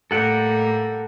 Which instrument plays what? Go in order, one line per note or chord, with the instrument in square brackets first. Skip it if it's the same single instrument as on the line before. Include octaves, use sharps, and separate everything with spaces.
[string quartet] A2 G3 A#3 [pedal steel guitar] A4 F#5 G5